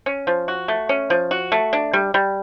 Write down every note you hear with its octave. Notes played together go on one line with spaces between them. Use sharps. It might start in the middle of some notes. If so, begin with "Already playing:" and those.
C#4
F3
F#4
A3
C#4
F3
F#4
A3
D4
G3
G3